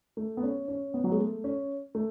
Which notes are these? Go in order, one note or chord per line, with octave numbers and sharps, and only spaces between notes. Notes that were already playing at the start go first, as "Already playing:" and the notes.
A3
B3
C#4
C#4
B3
F#3
G#3
A3
C#4
A3